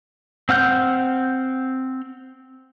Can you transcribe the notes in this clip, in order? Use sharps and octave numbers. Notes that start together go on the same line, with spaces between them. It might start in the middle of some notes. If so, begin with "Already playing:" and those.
C4 F#5 F6 G6